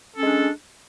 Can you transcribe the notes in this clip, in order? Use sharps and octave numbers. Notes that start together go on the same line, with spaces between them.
G#3 C#4 D4 A4